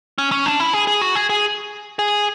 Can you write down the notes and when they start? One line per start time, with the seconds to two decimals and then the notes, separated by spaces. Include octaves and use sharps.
0.18 C#4
0.32 C#4
0.46 D4
0.60 E4
0.73 G#4
0.87 G#4
1.01 F#4
1.15 G#4
1.30 G#4
1.99 G#4